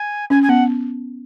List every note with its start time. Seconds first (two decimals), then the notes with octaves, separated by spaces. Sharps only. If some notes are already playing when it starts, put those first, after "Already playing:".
Already playing: G#5
0.30 C#4 G#5
0.43 G#5
0.49 B3 F#5